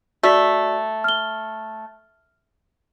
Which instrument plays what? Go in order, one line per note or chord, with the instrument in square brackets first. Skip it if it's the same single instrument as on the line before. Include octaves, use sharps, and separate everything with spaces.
[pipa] A3 [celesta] F#4 D5 B6
[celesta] F6 G7